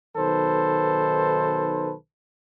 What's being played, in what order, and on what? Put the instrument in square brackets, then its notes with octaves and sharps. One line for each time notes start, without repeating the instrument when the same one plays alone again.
[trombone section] B1 D#3 A4 B4 C5